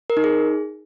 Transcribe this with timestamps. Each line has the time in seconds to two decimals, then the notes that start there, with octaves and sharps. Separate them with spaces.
0.10 A#4
0.17 D#4
0.24 G#4